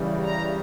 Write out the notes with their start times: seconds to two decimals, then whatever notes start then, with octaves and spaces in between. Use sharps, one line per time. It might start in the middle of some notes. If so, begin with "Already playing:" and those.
Already playing: C#3 E3 G3
0.21 A#5